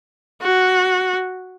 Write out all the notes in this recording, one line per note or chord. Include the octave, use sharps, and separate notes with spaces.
F#4